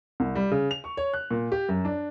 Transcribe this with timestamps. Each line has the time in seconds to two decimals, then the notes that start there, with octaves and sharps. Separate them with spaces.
0.20 C2
0.35 G3
0.51 C#3
0.71 F7
0.84 C#6
0.97 C#5
1.13 F#6
1.31 A#2
1.52 G4
1.69 F#2
1.85 D4